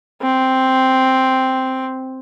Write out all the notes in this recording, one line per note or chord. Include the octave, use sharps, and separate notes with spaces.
C4